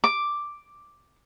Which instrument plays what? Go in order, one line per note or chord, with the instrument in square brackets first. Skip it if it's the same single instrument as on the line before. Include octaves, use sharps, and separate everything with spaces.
[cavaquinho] D6